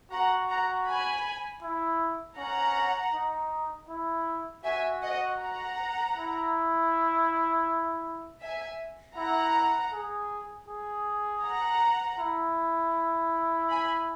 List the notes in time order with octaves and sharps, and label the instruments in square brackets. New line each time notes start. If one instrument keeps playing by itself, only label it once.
[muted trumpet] F#4 [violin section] F#5 A#5
[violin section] F#5 A#5
G#5 B5
[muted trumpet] E4
[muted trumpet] C#4 [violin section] F#5 A#5
[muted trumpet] D#4
E4
[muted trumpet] F#4 [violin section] E5 G#5
[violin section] D#5 F#5
F#5 A#5
[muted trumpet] E4
[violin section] E5 G#5
[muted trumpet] E4 [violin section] F#5 A#5
[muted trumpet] G#4
G#4
[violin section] F#5 A#5
[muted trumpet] E4
[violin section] G#5 B5